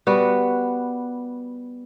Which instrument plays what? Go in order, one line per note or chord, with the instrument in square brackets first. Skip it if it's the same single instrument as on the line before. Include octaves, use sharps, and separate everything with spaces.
[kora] G3 B3 F#4